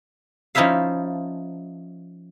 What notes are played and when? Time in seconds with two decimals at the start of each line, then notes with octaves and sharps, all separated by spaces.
0.55 F3 C#4 D#4 E4 E5 F5